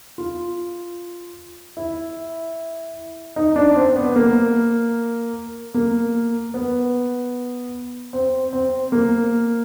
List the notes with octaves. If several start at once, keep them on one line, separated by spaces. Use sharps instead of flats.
F4
E4
D#4
D4
C4
B3
A#3
A#3
B3
C4
C4
A#3